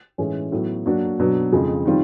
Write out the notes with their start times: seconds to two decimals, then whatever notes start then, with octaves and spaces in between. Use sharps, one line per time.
0.18 A2 E3 G#3 C#4
0.52 A2 F#3 B3
0.86 F#3 A#3 D4 F#4
1.19 B2 F#3 B3 D4
1.52 F2 C#3 F3 G#3
1.85 D#3 G3 C4 F4